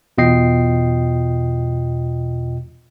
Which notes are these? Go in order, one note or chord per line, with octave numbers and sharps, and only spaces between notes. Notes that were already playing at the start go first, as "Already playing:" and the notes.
E2 B2 F4 D#5 G5 C7